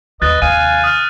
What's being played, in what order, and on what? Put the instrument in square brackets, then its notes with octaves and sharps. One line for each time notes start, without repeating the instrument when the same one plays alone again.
[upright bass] D#2 [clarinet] B4 [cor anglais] D#5 [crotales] F#6 A6
[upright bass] D#2 C3 [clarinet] F5 [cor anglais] G#5 [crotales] D#7
[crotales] D#6 F6